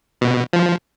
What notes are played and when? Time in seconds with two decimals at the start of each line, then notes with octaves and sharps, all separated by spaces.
0.21 B2
0.53 F3